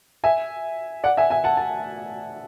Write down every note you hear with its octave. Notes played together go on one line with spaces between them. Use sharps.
E5 G#5
D5 F#5
E5 G#5
E5 G#5
F#5 A5
A5